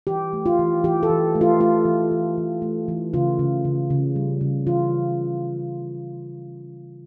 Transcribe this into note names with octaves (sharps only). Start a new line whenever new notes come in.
E3 G4
A3
F4
E3
E3 G4
A4
E3
A3
F4
A3 F4
E3
E3
E3
A3
E3
C#3 F4
C#3
C#3
C#3
G3
C#3
E3 F4